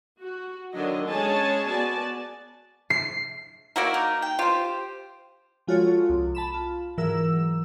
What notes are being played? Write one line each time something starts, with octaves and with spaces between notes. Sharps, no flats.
F#4
D3 D#3 F#3 D4 D#5
G#3 C#4 G#4 C#5 G#5 A5
B3 F#4 D5 G#5 A5
C7
A#3 E4 F#4 A#4 D5
D#4
G5
F4 G4 C5
F3 G#3 F4 F#4 A4 C#5
C2
A5 B5 E7
F4
G#2 E3 F#3 A#4 E6